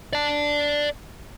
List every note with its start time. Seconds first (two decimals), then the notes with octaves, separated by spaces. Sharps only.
0.13 D5 A5